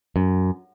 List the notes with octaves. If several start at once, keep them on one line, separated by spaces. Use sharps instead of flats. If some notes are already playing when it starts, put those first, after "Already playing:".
F#2